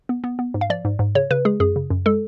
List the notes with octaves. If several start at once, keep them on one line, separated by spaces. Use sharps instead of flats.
B3
B3
B3
G#2
F5
F3 D5
G#2
G#2
C#3 C#5
C#3 B4
G#3 G#4
F#2 G#4
C#3
F#2
G#3 A4